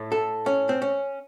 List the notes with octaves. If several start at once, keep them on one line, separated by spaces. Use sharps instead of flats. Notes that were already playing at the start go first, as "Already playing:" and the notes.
Already playing: A2 A3
A4
C#4
C4
C#4